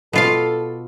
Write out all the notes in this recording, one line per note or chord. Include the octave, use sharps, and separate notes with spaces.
B2 F4 A4 F5